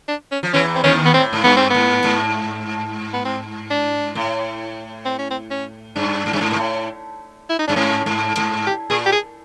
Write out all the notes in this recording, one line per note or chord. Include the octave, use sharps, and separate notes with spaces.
D4
C#4
F3
E2 E3 C#4
C4
D#2 D#3 C#4
B3
A2 C4
G#2
G2 B3
C4
G#2 B3
G#2
B3
C4
D4
A2
C4
C#4
C4
C#4
G2 D4
G#2
G2
G#2
A#2
A2
E4
D#4
G2 D4
G#2 C#4
G#2
G#2
G4
A#2 G#4
G4
G#4